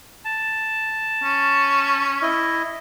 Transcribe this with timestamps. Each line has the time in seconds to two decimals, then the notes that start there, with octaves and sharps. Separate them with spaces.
0.25 A5
1.23 C#4
2.22 E4 D#5